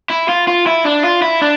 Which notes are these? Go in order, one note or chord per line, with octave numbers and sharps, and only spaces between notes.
E4
F4
F4
E4
D4
F4
E4
D4